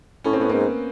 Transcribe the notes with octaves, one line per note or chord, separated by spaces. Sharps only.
A2 C#4
C4
A2 B3
G#2 A#3 C4